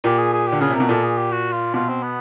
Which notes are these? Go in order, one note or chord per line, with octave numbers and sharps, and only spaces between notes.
A#2 G4
G#4
G#4
D3 G4
C#3 G#4
C3
B2 A#4
A#2 A4
G#4
G4
F#4
F4
B2 F4
C4
B3